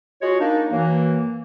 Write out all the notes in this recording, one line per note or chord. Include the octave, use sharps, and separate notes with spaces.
G#3 F4 F#4 C#5
A#3 D4 D#4
F#2 E3 A#3